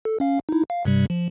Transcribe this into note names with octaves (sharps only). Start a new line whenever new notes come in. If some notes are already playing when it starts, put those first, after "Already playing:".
A4
C#4 F5
D#4 E4
F5
G2 C3 G3
F3